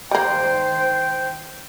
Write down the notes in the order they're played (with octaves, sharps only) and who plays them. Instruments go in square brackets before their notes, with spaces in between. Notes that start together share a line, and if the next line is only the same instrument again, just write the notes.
[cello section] D#3 C5 [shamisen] G3 A#3 [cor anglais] G5